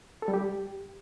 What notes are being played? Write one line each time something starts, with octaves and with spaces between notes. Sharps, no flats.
A4
G3
G4